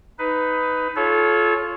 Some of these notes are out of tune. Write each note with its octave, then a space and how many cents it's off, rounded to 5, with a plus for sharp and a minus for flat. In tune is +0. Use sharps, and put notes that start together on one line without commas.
D#4 +10 B4 +15
F4 +0 A4 -30 C#5 +0